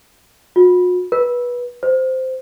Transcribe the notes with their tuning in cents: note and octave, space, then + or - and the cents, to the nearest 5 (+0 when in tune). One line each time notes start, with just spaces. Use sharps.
F#4 -45
B4 -20
C5 -10